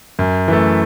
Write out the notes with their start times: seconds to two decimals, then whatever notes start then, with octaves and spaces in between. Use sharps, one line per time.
0.19 F#2
0.48 E3 A3